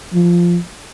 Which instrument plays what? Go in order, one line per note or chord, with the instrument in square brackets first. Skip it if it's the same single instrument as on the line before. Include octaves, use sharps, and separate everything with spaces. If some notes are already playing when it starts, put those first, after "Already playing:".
[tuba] F3